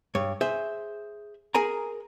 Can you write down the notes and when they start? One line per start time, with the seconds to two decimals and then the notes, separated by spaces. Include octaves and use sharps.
0.15 G2 C#5
0.41 G#4 C5 E5
1.55 G#4 A#4 G#5 A#5